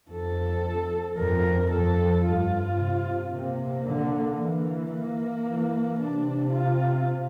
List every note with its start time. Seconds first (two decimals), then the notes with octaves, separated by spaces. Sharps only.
0.10 F2 A4
1.18 F2 A#4
1.71 F2 A4
2.24 G2 F4
2.79 C3
3.31 C3 A#3
3.85 D3
4.38 E3
4.92 A#3
5.45 E3
5.99 C3 D4
6.52 F4